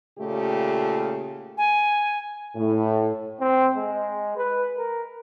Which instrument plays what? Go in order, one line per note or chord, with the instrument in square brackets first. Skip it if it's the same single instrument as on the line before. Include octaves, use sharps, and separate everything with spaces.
[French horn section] A#2 C#3 A3 F4 G4
[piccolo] G#5
[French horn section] A2
[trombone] C4
G#3
B4
A#4